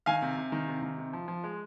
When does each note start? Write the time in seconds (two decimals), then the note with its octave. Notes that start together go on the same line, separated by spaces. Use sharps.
0.06 D#3 F5 G#5
0.22 C3
0.37 C3
0.52 D#3
0.68 C3
0.82 D#3
0.98 C3
1.13 F3
1.28 F3
1.44 G#3